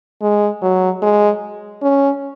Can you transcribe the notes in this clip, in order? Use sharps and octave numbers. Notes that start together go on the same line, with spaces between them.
G#3
F#3
G#3
C#4